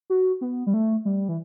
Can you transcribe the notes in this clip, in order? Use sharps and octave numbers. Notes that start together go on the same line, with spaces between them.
F#4
B3
G3
A3
G3
E3